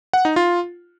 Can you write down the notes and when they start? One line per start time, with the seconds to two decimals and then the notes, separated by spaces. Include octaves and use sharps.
0.13 F#5
0.25 D#4
0.36 F4